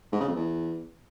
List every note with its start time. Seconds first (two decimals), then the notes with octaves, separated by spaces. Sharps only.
0.12 G#2
0.20 C#3
0.28 F2
0.36 E2